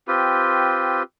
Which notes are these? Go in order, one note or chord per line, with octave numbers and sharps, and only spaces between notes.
C4 F4 G4 B4